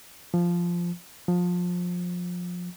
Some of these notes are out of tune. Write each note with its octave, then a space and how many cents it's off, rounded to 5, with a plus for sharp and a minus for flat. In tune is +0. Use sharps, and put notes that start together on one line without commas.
F3 -5
F3 +25